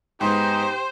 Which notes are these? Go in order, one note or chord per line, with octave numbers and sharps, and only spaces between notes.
G#2 G#3 B3 D#4 G4 C5